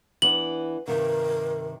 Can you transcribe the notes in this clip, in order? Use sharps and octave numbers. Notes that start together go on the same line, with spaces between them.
E3 B3 D4 F#7
G2 C3 D#3 A#4